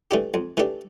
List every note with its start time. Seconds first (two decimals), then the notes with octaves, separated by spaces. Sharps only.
0.11 E3 A3 D4 G4
0.34 F2
0.57 E3 A3 D4 G4